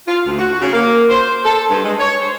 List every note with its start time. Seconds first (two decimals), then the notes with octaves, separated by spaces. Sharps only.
0.07 F4
0.26 D2
0.39 F#4
0.61 C#3
0.73 A#3
1.09 C5
1.45 A4
1.69 G2
1.84 G#3
1.99 C#5
2.21 C5